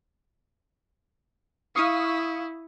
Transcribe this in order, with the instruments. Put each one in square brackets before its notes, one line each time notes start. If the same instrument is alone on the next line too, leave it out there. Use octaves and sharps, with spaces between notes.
[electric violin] E4 [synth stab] F5 C#6 D#6